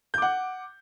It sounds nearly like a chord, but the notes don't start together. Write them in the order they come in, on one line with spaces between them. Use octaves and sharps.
G6 D6 F#5